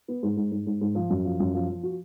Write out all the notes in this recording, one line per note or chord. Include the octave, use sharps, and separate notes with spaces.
B3
G#2
G#2
G#2
G#2
G#2
F3
F#2
F3
F#2
F3
F3
F#4